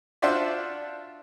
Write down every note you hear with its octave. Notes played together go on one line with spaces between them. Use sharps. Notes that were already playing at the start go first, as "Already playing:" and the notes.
D4 F4 F#4 C5 D5 E5